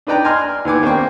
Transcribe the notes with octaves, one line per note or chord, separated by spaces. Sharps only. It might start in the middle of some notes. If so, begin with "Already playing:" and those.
D4 D#4 B4 D5 G5 A#5
G#5 A#5 C6 F6
D#2 B3 G#5 D6
A#3 C4 D4 C5 G5 C#6